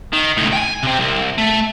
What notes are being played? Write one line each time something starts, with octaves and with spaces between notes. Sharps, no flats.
D#3
C#2 A2
G5 G#5
C3 C4
C2
A3